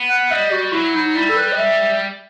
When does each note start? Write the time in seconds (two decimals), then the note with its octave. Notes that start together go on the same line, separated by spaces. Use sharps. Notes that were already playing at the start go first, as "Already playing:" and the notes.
Already playing: B3
0.09 F#5
0.30 G3 D#5
0.51 F#4
0.72 F#3 E4
0.94 D#4
1.15 G3 E4
1.29 A4
1.37 B4
1.52 D#5
1.58 E5